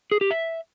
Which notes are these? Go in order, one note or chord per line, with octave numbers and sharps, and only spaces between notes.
G#4
G4
E5